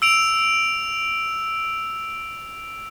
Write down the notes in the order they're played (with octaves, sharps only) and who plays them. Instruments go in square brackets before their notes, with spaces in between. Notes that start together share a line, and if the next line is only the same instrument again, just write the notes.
[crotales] E6 D7 F7